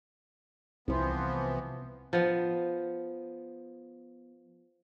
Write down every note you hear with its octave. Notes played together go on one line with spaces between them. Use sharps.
C2 E3 F3 B3 C4 C5
F3 B3